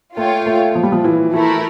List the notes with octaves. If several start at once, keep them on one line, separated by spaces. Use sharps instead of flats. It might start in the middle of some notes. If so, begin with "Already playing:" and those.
A3 F4 C#5 G5
A3
F3
G3
F3
E3
E3 A3 E4 A#4